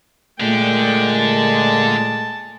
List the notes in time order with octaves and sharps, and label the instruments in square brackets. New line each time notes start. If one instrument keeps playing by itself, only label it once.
[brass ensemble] A#2 G#3 A4 [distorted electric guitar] D3 D4 [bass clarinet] A3 [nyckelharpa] G5
[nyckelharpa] A5